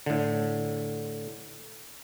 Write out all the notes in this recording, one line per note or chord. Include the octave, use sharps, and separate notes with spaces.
A2 D3